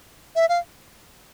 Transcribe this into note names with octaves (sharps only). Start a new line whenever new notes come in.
E5
F5